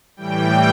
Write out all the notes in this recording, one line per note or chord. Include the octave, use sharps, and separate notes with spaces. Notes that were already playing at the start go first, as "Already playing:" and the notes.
A2 E3 G3 G5